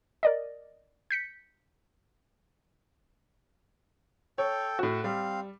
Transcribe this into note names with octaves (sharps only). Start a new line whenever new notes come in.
A#4 D5 D#5
G6 B6 C#7
A4 C#5 G5
A2 F#4
G3 C4 F5